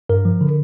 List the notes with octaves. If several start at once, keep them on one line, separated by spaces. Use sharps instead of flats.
G2 A#4
F3
D3